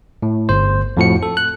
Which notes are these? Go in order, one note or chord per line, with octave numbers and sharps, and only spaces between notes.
A2
G1 C5
F2 A2 F3 F#4 C#7
A4
F#6